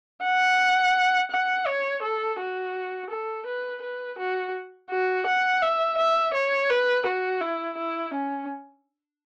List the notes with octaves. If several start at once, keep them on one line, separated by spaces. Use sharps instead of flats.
F#5
F#5
C#5
A4
F#4
A4
B4
B4
F#4
F#4
F#5
E5
E5
C#5
B4
F#4
E4
E4
C#4